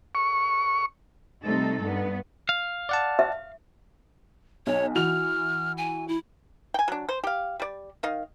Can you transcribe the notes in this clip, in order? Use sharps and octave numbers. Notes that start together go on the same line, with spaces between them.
C#6
C3 G3 A3 D#4 A4
G2 B3
F5
D5 F#5 A5
E5
B1 C#5
E3 F#4 F6 F7
G#5
E4
G5 G#5
F#3 D4
C5
G4 F5
G3 D5
D#3 D#5 F5